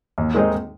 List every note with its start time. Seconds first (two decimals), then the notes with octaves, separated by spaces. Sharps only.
0.18 D#2
0.34 D#3 G#3 C4 D#4